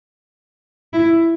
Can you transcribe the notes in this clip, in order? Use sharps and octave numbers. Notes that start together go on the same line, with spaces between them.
E4